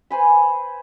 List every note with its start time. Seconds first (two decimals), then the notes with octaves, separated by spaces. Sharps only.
0.10 B4 C5 G#5 B5